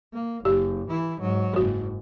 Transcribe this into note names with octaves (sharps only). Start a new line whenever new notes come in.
A#3
F#1 G4
E3 E4
G#2 F#3
F#1 G#2 F#4